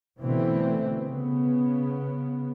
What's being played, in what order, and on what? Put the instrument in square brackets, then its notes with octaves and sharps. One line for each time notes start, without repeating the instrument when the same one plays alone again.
[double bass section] B2 D3 E3 A3 C4
C#3 B3